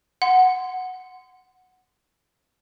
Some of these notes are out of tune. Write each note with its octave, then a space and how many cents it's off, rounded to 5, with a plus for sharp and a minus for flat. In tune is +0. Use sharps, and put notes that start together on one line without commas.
F#5 +0 C6 -25